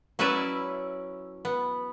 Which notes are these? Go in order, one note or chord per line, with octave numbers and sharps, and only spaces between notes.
F#3 C#4 E4 B4 D5 E5
B3